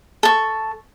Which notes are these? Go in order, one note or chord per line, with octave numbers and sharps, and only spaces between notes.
A4 C#6